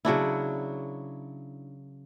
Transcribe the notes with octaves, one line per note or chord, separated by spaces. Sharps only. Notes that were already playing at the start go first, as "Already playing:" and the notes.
C#3 F#3 D4 E4